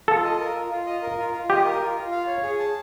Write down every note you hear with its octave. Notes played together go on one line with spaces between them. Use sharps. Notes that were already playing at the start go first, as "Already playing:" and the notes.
F4 A4
D#5
A#4
F4
F4
D#5
A#4
F4
F4
G4 D#5
A#4
F4
F4
F5
C#5
G#4
A5